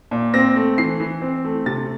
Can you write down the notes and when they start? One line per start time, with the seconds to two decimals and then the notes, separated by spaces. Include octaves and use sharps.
0.11 A#2
0.34 C4 A#6
0.56 A3
0.78 E3 C7
1.00 E3
1.22 C4
1.45 A3
1.66 C3 A6